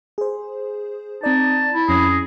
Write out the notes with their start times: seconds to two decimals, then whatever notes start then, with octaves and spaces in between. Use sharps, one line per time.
0.18 G#4 C5
1.23 C4 D#4 D5 A5
1.73 E4
1.89 F2 C#4 G#4 A#6